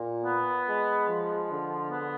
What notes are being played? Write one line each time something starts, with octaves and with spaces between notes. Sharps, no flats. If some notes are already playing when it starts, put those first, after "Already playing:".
Already playing: A#2
B3
G#3
F3
D3
B3